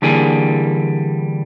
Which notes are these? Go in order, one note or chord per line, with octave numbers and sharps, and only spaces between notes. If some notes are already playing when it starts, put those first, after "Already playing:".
D3 E3 G3 A#3 G#4